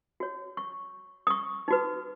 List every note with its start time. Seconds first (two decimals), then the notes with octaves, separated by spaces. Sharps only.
0.20 F#4 C#5
0.57 C#6
1.27 D#6
1.30 C#6
1.68 D#4 F#4 B4